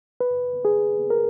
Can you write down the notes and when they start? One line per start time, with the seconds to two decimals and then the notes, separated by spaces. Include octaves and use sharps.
0.21 B4
0.65 G#4
1.10 A#4